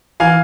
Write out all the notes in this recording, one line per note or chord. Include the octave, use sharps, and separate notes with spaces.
E3 F5 G#5